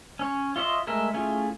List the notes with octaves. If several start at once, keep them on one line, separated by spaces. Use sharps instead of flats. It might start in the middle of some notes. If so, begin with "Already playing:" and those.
C#4 C#5
F4 C#5 D#5 E5 C6
G#3 A3 A#4 E5
A3 C#4 E4 F4 G#4